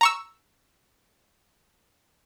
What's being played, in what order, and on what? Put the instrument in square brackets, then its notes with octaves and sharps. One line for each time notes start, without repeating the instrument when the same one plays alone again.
[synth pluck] A#5 C#6 E6